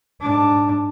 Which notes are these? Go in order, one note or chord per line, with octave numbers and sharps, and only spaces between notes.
G#2 D4